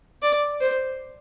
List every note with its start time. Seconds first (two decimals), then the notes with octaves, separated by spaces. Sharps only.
0.22 D5
0.61 C5